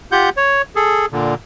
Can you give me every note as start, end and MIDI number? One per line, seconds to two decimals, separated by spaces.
0.12 0.29 65
0.12 0.29 67
0.12 0.29 78
0.12 0.29 91
0.37 0.62 73
0.76 1.06 68
0.76 1.06 69
1.12 1.34 46
1.12 1.34 50